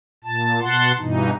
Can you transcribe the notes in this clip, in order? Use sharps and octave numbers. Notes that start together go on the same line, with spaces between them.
A#2 A5
B2 F#5 A5 C6
G2 B2 E3 D#4